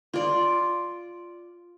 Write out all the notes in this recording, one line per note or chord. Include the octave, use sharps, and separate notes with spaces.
F4 D5